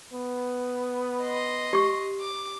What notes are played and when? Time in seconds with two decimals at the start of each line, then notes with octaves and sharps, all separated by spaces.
0.13 B3
1.23 D#5 C6
1.73 G4 C#6
2.20 D6